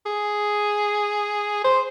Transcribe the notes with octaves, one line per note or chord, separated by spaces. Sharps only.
G#4
C5